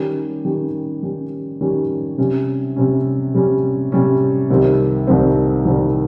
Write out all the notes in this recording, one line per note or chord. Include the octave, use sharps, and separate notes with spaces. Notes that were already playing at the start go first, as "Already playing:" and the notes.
Already playing: D#3 G3 C#4 G4
D#3 G3 C#4 G4
D#3 G3 C#4 G4
D#3 G3 C#4 G4
C3 G3 C#4
C3 G3 C#4
C3 G3 C#4
C3 G3 C#4
C2 C3 D#3 G3 C4
C2 C3 D#3 G3 C4
C2 C3 D#3 G3 C4